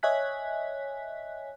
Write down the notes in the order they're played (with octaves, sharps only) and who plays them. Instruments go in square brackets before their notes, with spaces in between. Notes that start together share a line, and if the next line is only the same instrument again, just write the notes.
[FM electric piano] C#5 D#5 E5 G#5 F#6 B6